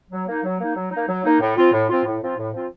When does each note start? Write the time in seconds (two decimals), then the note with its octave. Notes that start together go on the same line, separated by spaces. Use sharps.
0.11 F#3
0.27 A#3 D#4
0.44 F#3
0.59 A#3 D#4
0.75 F#3
0.92 A#3 D#4
1.08 F#3
1.24 A#3 D#4
1.41 A2
1.57 F3 C4 F4
1.72 A2
1.90 F3 C4 F4
2.05 A2
2.22 F3 C4 F4
2.37 A2
2.54 F3 C4 F4